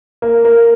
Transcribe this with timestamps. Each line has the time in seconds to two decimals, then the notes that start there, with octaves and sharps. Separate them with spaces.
0.22 A#3
0.45 A#3